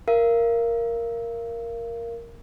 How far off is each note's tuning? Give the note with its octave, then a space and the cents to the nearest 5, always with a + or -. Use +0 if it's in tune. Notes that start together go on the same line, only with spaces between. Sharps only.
A#4 +0 F5 -35